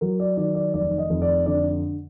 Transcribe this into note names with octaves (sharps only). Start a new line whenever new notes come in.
F#3 A#4
D5
D#3 D5
D5
F1 D5
D#5
F2
D5
D3 D5